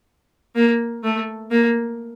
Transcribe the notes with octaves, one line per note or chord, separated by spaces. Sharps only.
A#3
A3
A#3